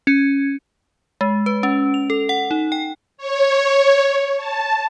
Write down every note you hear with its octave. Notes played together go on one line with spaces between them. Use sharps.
C#4
G#3
B4
C#4
F7
A4
F#5
D#4
G5
C#5
A5